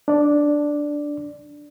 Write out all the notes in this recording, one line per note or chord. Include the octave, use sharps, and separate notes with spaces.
D4 D5